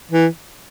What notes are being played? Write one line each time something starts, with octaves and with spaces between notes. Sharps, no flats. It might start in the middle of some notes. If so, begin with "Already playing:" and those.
E3